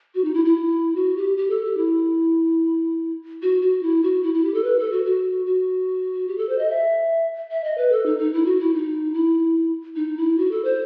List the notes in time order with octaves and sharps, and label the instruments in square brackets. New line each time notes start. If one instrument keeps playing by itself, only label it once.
[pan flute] F#4
D#4
E4
E4
F#4
G4
G4
A4
G4
E4
F#4
F#4
E4
F#4
E4
E4
G4
A4
B4
A4
F#4
F#4
F#4
G4
A4
C5
D#5
E5
E5
D#5
B4
A4
D#4
D#4
E4
F#4
E4
D#4
E4
D#4
E4
F#4
A4
C5